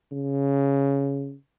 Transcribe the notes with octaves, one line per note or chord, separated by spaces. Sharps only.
C#3